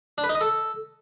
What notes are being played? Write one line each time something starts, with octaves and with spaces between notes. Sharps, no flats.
D4
B4
D#4
D#5
A4